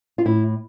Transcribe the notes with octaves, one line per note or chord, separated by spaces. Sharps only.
F4
A2 E4